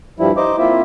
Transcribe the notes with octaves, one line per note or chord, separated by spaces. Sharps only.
G2 F3 G3 E4
D#4 C5 D#5 D6
A#3 C4 E4 F4 E5